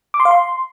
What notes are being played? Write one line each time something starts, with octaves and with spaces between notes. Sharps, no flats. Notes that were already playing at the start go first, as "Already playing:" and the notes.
D6
C6
F5
C6